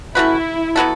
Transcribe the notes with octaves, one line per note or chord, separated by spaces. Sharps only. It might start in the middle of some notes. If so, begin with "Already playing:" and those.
A3 C#4 E4 F#4 B4
F#3 B3 F#4 A4